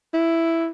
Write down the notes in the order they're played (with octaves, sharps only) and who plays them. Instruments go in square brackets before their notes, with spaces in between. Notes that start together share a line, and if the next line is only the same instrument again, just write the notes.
[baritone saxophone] E4